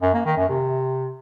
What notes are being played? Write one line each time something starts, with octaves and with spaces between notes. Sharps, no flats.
F#2
A#3
D#3
F#2
C3